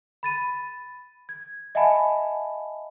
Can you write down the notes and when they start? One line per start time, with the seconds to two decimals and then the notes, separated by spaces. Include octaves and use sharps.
0.23 B5 A6 D#7
1.29 G#6
1.75 D#5 E5 F#5 G#5 A5 B5